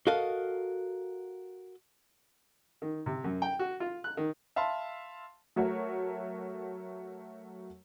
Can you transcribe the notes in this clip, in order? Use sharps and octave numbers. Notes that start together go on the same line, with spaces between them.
F#4 A4 A#4 D#5 F5
D#3
C3
F#2
G5
F#4
F4
F#6
D#3
E5 F5 A5 B5 C6
F#3 A3 F#4 A#4 C#5